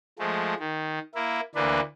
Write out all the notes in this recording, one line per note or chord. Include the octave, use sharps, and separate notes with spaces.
F3 G#3 A3
D#3
A#3 E4
D2 E3 A#3 D4 B4